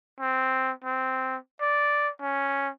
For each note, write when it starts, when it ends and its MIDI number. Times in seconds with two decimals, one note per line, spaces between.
0.20 0.71 60
0.84 1.36 60
1.61 2.10 74
2.21 2.69 61